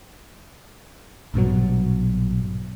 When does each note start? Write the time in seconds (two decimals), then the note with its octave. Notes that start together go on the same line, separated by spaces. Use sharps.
1.34 A#1 G2 B2 F#3